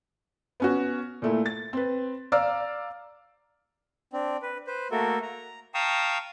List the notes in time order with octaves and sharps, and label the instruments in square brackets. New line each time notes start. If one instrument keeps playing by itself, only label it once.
[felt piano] B3 C#4 F#4
A#2 A3 E4
A6
C4 B4
D5 F5 A#5 E6 F6
[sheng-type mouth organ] C4 D4
B4
B4 C5
A3 A#3 F#4 A4 A#4
A#5
F5 G5 A5 A#5 C#6 D#6